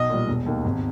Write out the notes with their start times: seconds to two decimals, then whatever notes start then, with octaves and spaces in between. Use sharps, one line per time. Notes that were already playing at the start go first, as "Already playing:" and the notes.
Already playing: B1 D#5
0.10 A#2 G3
0.28 E1
0.46 D#2 D#3
0.64 G#1